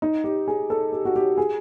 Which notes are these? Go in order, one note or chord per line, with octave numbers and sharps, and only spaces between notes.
D#4
G4
G#4
A4
G4
F#4
G4
G#4